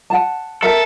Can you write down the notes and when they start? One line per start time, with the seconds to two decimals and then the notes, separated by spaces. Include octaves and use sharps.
0.10 F#5 A5
0.63 A4 A#4 E5